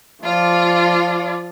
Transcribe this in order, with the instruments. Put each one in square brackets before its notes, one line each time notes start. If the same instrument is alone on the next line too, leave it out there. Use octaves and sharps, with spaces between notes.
[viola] F3 D5 [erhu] F4